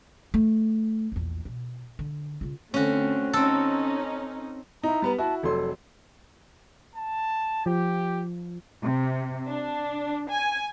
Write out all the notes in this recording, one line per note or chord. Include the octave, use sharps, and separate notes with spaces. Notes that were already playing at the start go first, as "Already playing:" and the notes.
A3
A#1 E2
B2
D3
C#3 F4
D3 A3 C4 C#4 F#4
C4 C#4 D#4 A4
D#4 E4 A#5
G3 B3 B4
E4 F#4 A5
F1 F#3 A4 C6
A5
F3 G4
C3
D4
G#5